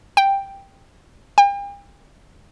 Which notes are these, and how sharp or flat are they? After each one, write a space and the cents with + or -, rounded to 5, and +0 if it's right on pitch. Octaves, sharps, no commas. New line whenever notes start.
G5 +5
G5 +40